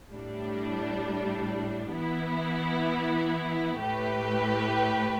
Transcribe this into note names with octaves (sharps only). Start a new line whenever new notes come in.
A2 G3 D4
E3 B3 E4
A2 A3 G4 B4